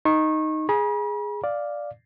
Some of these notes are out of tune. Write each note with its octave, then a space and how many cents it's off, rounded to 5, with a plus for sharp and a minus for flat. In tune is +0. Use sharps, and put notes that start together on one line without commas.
D#4 +0 C#6 -30
G#4 +0 B5 -45
D5 +0 F5 +0